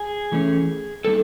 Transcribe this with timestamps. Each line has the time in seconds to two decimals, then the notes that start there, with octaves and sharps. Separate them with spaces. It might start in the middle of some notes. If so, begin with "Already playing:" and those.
Already playing: G#4
0.32 E3 A3 C#4
1.05 D3 G3 A#3 D#4 A4